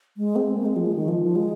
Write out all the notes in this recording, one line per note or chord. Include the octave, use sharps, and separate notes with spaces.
G#3
C4
A#3
G#3
F3
G#3
D#3
F3
F3
G#3